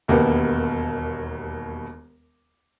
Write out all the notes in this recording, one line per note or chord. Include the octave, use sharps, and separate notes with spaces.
E1 D#2 A#3 B3 G4